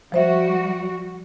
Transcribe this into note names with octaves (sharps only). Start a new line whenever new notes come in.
F3 G3 F#4 C5 E5